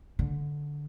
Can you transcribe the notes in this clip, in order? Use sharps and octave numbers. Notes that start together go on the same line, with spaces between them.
D3